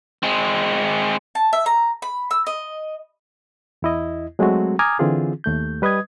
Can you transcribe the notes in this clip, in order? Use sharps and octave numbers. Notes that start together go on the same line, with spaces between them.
G#3 C4
A5
E5
A#5
B5
E6
D#5
E2 E4 D#5
F#3 G#3 A3 C4 F#4
G#5 A#5 D6 D#6 F6 G#6
D3 E3 C4 F4 G#4
D#2 A3 G6
G3 B4 D#5 D#6 G#6